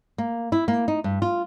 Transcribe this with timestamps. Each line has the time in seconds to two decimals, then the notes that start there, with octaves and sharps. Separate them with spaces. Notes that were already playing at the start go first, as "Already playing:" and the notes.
0.18 A#3
0.52 E4
0.68 A#3
0.88 D#4
1.04 G2
1.22 F4